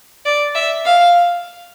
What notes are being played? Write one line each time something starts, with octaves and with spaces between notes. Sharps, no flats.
D5
E5
F5